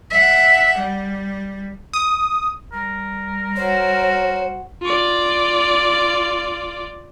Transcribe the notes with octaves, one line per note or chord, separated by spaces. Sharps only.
E5 F#5
G3
D#6
G3 A#4
F#4 C5 C#5
F4 D5